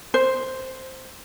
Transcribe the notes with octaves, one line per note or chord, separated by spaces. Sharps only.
C5